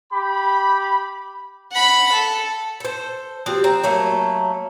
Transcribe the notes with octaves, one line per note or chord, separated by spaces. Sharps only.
G4 B5
F#5 B5
A4
A4 C5
F3 C4 F#4 G4
C4 A#5
F#3 A3 A#3